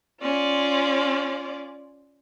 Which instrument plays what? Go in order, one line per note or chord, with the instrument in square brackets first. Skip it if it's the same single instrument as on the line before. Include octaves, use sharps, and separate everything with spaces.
[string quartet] C#4 F4 D5